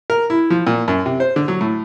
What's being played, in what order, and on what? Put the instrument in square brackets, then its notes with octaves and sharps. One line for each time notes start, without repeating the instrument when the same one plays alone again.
[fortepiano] A#4
E4
F3
A#2
F#2
C3
C5
D3
F#3
A2